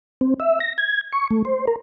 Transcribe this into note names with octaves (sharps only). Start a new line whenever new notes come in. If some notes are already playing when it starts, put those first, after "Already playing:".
C4
E5
A#6
G#6
C#6
A3
C5
A#4